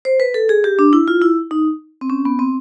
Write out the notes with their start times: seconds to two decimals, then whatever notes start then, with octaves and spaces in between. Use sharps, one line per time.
0.05 C5
0.20 B4
0.34 A4
0.49 G#4
0.64 G4
0.79 D4
0.93 E4
1.08 F4
1.22 E4
1.51 D#4
2.01 C4
2.10 C#4
2.25 B3
2.39 C4